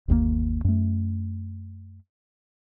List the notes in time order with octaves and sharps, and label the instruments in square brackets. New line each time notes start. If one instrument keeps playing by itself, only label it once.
[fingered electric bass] G1 D#2 B2 A#3
F#2 A3